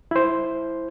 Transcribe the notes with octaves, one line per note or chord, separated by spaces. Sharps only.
E4 C5